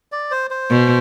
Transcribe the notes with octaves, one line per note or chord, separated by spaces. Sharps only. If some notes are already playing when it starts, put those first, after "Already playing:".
D5
C5
C5
B2